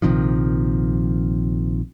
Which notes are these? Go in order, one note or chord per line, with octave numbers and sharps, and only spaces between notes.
A#1 C3 D#3 F3